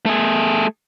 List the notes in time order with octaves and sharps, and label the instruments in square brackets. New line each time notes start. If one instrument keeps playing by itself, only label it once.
[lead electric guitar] A3 G#4